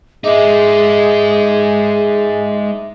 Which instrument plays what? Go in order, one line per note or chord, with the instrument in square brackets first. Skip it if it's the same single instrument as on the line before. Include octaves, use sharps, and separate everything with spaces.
[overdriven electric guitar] G#3 D#4 [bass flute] G#4 [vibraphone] D#5 E5 D6